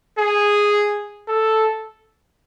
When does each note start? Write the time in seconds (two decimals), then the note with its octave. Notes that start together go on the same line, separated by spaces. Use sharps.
0.18 G#4
1.28 A4